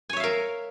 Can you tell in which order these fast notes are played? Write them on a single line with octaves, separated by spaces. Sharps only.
G#5 C#5 E5 F5 A#4